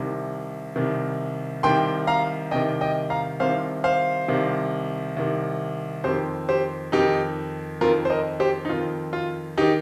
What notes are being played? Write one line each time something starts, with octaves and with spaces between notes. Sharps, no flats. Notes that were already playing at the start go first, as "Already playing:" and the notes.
Already playing: C2 C3 D#3
C2 C3 D#3
C2 C3 D#3 G5 C6
F5 A#5
C2 C3 D#3 D#5 G5
D#5 G5
F5 A#5
C2 C3 D#3 C5 F5
C5 F5
C2 C3 D#3
C2 C3 D#3
F2 D#3 G4 C5
G4 C5
F2 D#3 D#4 G4
F2 D#3 F4 A#4
C5
A#4 D#5
G4 C5
D#4
F2 D#3 F4
F4
D#3 D#4 G4